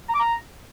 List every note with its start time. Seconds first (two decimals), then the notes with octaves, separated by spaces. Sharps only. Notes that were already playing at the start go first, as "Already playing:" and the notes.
0.09 A#5
0.14 D6
0.19 A#5